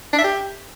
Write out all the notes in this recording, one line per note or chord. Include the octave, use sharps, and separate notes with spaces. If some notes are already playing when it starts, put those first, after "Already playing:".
D4
E5
G4